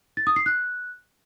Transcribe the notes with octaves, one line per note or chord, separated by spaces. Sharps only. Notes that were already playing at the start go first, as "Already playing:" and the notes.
A6
D#6
C7
F#6